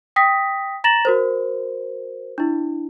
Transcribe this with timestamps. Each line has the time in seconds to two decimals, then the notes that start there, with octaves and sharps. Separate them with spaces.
0.16 G5 D#6 A#6 B6
0.84 A#5 A6 A#6 E7 F#7
1.05 F#4 A#4 C5
2.38 D4 E4